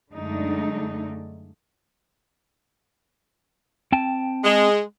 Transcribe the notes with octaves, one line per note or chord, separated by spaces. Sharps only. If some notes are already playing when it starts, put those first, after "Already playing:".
F#2 D3 G#3 A3 D4 D#4
C4 G5 A5
G#3